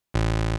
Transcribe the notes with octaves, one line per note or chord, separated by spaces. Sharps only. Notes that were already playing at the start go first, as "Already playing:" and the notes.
A1